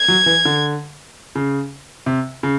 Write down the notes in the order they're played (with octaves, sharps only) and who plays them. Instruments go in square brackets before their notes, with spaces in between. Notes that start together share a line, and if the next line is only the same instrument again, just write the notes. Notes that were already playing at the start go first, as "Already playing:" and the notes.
Already playing: [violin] G#6
[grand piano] F#3
E3
D3
C#3
C3
C#3